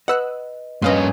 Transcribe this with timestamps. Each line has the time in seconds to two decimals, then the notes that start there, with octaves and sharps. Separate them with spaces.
0.08 B4 D#5 F#5 E6 F#6
0.82 G2 A#3 C#4 B4 D#5 F5 C6